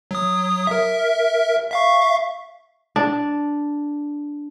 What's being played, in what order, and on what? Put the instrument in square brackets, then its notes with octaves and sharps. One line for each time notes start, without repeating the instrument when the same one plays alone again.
[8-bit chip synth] F#3 D#6
A#4 E5
E5 F5 C#6
[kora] D4